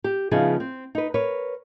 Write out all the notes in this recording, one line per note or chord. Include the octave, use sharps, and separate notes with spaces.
G4
C#3 F3 B3 D#4 E4 G#4
C4
D#4 B4
A#4 B4 C#5